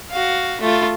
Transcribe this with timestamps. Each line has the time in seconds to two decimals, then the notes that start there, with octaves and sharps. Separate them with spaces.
0.11 F#4 F5
0.61 A3 F4